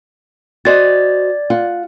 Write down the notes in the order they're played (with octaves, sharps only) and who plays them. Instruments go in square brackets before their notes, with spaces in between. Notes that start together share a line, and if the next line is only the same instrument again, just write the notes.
[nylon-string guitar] F#4 C5 D#5 [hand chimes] D5 A6
[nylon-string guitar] F4 F#5